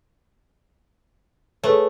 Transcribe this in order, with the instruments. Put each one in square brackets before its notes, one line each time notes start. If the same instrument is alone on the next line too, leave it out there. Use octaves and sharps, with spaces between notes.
[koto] A3 [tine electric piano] G#4 B4 C#5